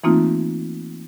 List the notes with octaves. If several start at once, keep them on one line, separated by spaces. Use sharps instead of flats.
E3 A3 A#3 C4 D#4 F4